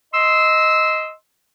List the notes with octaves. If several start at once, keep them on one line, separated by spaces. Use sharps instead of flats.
D#5 C6 E6